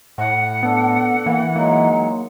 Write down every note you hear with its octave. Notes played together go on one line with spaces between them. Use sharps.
A2 F#5
B3 D4 A4
E3 A#3
F#3 G#3 A#3 D#4